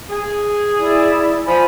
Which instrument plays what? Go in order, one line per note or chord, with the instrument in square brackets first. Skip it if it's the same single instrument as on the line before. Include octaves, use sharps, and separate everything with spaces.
[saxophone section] G#4
[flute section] E4 D5
[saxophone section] F3 [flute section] C5 G#5 B5